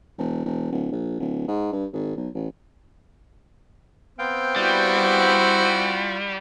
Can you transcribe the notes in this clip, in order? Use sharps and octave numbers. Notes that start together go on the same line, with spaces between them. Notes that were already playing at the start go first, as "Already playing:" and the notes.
E1
E1
D1
A#1
D1
G#2
G2
G#1
B1
A1
B3 C4 F5 G5
G3 E4 F#4
F4